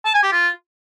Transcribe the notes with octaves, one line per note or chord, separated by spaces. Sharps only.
A5
G#5
G4
F4